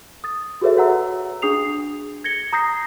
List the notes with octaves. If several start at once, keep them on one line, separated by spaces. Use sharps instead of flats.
D#6 A6
F#4 G#4 A4 B4 C#5 E5
F#4 C#5 F#5 A#5 E6
D4 G#4 D#6 C7 F7
G#6 A#6 C#7 G7
A#5 D#6 G6 A#6 C7